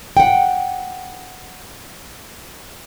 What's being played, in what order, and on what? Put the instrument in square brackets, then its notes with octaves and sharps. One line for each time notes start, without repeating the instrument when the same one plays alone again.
[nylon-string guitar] F#5 G5